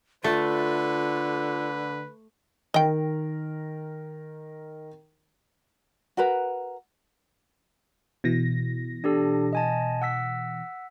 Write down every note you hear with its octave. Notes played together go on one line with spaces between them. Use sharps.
D3 A3 F4 B4
D#3 A#4 D#5 G5
F#4 A#4 B4 A#5
B2 E3 A#6
D4 G4 A4
D#5 G#5 A5
F#5 E6 B6